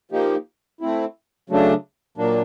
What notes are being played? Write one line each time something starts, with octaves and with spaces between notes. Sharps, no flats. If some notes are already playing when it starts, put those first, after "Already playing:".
F3 A#3 D#4 G4
A3 C4 E4
C#3 F#3 A3 D4
A#2 F#3 A#3 D4